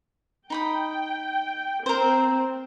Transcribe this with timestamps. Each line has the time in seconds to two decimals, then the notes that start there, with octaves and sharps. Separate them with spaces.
0.50 D#4 G5 B5 D#6
1.86 C4 A#4 C5